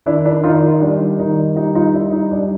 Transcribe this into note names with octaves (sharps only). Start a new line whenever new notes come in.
D#3 D4 E4
D4 E4
D#3 D#4 F4
D#4
G3 D4
D#3 D#4
G3 D#4
D#4 F4
G3 D4 E4
D#4
G3 D4